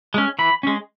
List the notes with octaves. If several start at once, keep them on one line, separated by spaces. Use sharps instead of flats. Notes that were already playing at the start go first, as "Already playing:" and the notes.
G#3 C#4
E3 B5
G#3 C#4